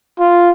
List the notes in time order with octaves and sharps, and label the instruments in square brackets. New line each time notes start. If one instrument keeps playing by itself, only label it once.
[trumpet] F4